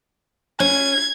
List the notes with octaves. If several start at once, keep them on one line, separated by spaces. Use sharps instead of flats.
C#4 G#6